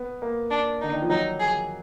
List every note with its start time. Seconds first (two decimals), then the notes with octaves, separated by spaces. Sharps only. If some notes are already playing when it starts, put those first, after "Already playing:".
Already playing: B3
0.22 A#3
0.51 D4
0.81 D3 D#4
0.93 D#3
1.02 F3
1.10 F#3 D#4
1.40 G#4